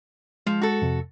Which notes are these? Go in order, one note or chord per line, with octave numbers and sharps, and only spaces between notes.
F3 G#3
F#4 A4
F2 C3